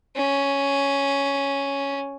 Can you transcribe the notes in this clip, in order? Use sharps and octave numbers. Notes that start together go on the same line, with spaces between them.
C#4